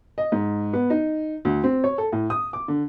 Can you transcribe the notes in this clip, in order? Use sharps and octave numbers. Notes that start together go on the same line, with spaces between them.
D#5
G#2
B3
D#4
D2
C4
C#5
A4
A2
D#6
D6
D3